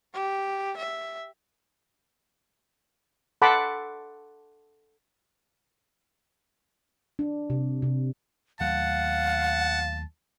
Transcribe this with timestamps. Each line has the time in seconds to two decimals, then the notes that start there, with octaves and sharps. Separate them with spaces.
0.14 G4
0.77 E5
3.42 A4 F#5 A5 B5 C6 D6
7.19 D4
7.50 C3
7.82 C3
8.60 D#2 F#3 A3 F5 F#5 A5